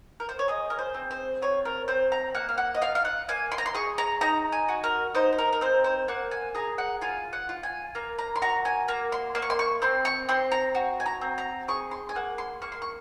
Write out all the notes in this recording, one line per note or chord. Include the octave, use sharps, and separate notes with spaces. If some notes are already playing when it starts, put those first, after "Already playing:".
A#4
C5
C#5
G#4 D#5
A#4
C5
C4
C5
F4 C#5
A#4
C4 C5
A#5
A#3 F#5
F5
F#5
D#5
F4 F5
F5
F#5
A#3 G#5
C6
A#5
C6
G#4 C#6
A#5
D#4 A#5
G#5
F#4
A#4
D#4 C5
C5
A#4
A#4
C4 C5
C5
A#3 F#5
G#5
G#4 A#5
F#5
F4 G#5
F#5
F4
G#5
A#3 A#5
A#5
C6
F#4 A#5
G#5
A#3 A#5
C6
A#3 C6
C#6
C6
C#6
C4 C6
C#6
C4 C6
A#5
F#4
G#5
A#5
C4
A#5
G#4 C#6
C6
G#5
A#3 F#5
C6
A#3 C#6
C6
C#6